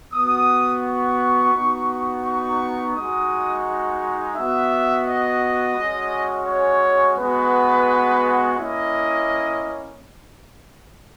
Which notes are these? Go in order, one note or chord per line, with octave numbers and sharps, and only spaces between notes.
B3 F#4 D#6
C#6
B3 D#4 F#4
C#6
G#3 D#4 F#4 D#6
B3 F#4 E5
D#5
G#3 C#4 F#4
C#5
G#3 B3 F#4 B4
A#3 C#4 E4 D#5